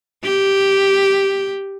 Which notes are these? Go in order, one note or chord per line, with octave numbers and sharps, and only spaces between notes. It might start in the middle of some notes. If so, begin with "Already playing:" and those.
G4